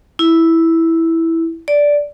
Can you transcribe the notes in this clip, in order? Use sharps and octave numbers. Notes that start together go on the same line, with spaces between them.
E4
D5